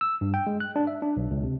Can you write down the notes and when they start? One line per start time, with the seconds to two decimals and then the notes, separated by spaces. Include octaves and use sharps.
0.01 E6
0.21 G2
0.34 G5
0.47 G#3
0.60 F#6
0.76 D4
0.87 E5
1.02 D4
1.17 B1
1.31 C#2
1.44 C3